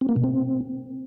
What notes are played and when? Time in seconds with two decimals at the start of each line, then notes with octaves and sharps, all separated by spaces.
0.01 C4
0.09 A#3
0.16 B2
0.24 C4